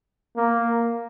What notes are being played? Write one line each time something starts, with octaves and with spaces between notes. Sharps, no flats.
A#3